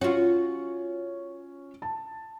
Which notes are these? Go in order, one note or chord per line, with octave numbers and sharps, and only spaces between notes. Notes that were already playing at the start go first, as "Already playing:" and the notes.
C#4 F4 F#4 C#5
A5